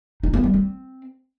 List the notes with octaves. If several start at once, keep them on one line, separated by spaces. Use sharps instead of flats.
D#4
B3
G3
C4